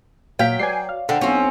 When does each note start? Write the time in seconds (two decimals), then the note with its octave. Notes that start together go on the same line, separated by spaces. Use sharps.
0.39 A#2 F#3 F5 G5 B6
0.59 B4 C#5 D5 G#5 C7
0.89 F5
1.09 D3 C5 F#5 G5
1.21 B1 C4 C#4